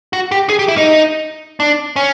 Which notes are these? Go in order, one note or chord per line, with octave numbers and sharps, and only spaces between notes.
F#4
G4
G#4
G4
E4
D#4
D4
C#4